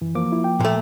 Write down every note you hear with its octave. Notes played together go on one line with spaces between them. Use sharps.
F#2 E3
F3 A#3 D6
E4 F4
G5
A#2 A3